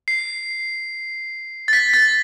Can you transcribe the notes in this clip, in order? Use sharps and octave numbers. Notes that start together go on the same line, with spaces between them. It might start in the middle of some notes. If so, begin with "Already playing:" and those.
C7
A6
B6
A6